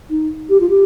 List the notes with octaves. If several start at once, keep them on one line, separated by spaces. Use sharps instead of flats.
D#4
G4
F4
G4